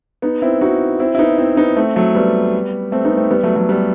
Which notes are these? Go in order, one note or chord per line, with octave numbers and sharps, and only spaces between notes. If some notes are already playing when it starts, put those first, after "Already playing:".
B3 D#4
C4 E4
D#4 F#4
C4 E4
E4
B3 D#4
C4 E4
B3 D#4
A3 C4
F#3 A3
G3 B3
A3 C4
B3 D#4
A3 C4
G3 B3
F#3 A3
F#3 A3
G3 B3